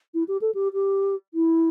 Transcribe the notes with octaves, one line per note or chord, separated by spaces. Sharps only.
E4
G4
A4
G4
G4
E4